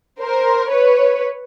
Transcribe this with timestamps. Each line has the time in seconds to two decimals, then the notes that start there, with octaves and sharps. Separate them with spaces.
0.21 A#4 C5
0.69 B4 C#5